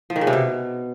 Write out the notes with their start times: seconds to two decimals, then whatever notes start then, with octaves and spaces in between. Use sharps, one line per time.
0.10 F3
0.16 D#3
0.21 C#3
0.27 C3
0.33 B2